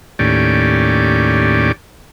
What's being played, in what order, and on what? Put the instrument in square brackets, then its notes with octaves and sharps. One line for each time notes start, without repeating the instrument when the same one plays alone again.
[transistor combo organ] D#2 A2 C#4 G4 D5